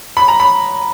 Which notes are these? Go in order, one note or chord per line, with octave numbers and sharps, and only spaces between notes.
B5
A#5
B5